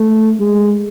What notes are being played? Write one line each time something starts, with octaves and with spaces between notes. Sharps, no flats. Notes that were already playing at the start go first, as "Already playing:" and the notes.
Already playing: A3
G#3